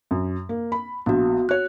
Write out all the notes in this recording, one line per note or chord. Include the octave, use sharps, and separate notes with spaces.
F#2
A#3
B5
A#1 B3 F#4
F#4 C#5 F#6